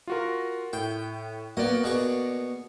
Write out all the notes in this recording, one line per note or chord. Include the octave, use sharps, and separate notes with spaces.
F4 F#4 A#4
A2 G5
A#3 B3 F#4 A#4 D5 D#5
B2 G#4 C#6